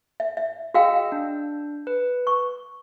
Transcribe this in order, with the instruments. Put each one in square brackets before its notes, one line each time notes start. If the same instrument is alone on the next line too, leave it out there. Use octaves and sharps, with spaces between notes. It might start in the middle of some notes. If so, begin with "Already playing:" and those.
[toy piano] E5
E5
[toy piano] F#4 F5 G5 [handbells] G#4 D#5 E6
[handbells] D4
B4
[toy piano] C#6